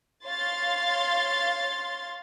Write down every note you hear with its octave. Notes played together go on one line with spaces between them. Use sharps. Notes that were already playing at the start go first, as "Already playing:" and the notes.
C#5 F5 C6 A6